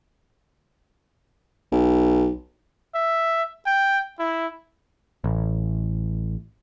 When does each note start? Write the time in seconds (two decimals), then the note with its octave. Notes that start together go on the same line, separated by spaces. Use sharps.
1.72 B1
2.95 E5
3.66 G5
4.19 E4
5.24 A1